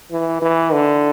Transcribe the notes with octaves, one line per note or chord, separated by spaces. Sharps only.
E3
E3
D3